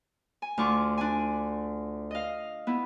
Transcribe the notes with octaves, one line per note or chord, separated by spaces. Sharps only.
G#5
D2 F4 C#6 D6
D4 G#5
D#5 F5
B3 E4